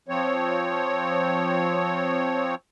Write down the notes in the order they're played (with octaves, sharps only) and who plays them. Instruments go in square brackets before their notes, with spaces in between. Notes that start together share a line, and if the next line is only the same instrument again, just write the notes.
[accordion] F3 C4 C#5